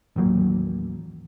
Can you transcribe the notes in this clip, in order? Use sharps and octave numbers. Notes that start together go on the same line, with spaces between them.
A1 D#2 F#3 A#3